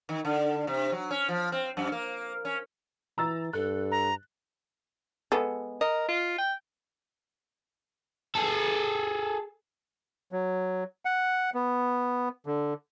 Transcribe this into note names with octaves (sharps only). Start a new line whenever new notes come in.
D#3
D3
C3
F#3
C#4
F3
C4
F#2
A#3
C#4
E3 A#5 E6 A6
G2 A4 F#6
A#5
G#3 B3 A4
A#4 D#5
F4
G5
G#4 A4
F#3
F#5
B3
D3